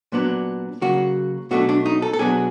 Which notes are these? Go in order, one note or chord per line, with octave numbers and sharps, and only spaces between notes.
A#2 F#3 B3 D4
C#3 F#3 A#3 F#4
B2 F#3 A3 D4 F#4
D4
D#4
A4
A4
B2 F#3 B3 D4 G#4